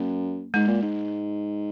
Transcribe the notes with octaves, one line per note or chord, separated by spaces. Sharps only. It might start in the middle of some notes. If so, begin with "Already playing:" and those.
Already playing: F#2 A#3
G#2 G#3
A#2
G#2